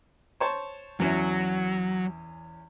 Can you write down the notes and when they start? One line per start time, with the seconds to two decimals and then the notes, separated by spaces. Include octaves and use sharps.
0.40 C5 C#5 A5
1.00 E2 F#3 C#4 E4